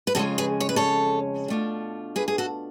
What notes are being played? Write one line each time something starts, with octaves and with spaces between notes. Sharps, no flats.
B4
F2 C#3 G#3 C#4 F4 F#4 A4
G#4 B4
C#5
B4
A4 C#5
B2 A3 D4 F4
G#4 B4
G#4
F#4 A4